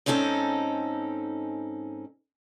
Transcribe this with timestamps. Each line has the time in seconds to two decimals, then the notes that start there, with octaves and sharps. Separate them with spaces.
0.06 G#2 C4 C#4 D#4 F#4 A4